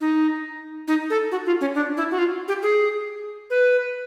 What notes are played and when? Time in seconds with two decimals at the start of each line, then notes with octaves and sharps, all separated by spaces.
0.01 D#4
0.88 D#4
1.10 A4
1.31 F#4
1.46 F4
1.61 C#4
1.75 D4
1.97 E4
2.11 F#4
2.19 F4
2.48 G4
2.62 G#4
3.50 B4